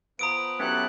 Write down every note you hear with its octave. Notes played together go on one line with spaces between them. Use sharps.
F3 B3 B4 A#5 D#6 D7
F#3 B3 C#4 E4 G4 A4 F#6